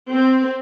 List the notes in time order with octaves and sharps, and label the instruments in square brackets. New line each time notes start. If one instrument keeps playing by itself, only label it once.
[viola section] C4